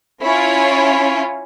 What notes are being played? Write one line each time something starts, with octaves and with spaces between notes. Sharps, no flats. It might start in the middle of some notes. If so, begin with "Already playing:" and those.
C#4 E4 F4 C#5